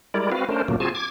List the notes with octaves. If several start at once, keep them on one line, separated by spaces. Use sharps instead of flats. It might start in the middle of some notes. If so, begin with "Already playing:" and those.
G3 G#3 E4 A#4 D5
C4 F#4 B4 F5
A3 C#4 D4 A#4 C5
A#2 C#3 F#3 A3 A#3
C4 F4 F#4 G#4 G#5 A5
D6 G#6